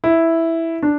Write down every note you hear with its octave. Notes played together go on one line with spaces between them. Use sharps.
E4
D4